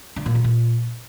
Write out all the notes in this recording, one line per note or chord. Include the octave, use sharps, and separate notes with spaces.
D3
A#2
D3
A#2